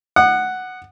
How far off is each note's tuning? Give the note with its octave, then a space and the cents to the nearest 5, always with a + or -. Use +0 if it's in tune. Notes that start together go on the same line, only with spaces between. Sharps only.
F#5 +0 D#6 -35